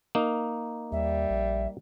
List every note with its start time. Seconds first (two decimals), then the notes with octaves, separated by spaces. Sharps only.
0.15 A#3 D#4
0.92 D#2 G3 E5
1.30 A#1